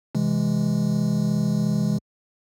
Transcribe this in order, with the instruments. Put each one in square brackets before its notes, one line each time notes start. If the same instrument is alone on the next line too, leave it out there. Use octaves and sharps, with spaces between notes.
[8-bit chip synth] C3 E3 G#3